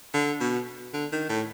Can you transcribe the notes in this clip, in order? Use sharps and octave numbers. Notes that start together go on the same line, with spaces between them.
D3
B2
D3
D#3
A2